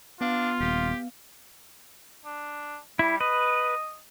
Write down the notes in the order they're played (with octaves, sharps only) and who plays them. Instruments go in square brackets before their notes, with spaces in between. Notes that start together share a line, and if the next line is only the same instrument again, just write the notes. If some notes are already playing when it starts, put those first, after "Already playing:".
[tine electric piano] B3 F5 [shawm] D4 [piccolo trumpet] F4
[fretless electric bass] D#1 [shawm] G4
[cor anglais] D4
[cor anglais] G3 [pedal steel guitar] E4
[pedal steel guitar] B4 [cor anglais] D#5